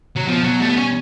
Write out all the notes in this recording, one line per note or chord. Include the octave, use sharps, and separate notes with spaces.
F#3
B2 F3
B2 F#3
G3 A3
B3
C#4